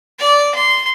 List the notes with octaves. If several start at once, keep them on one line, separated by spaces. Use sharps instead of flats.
D5
C6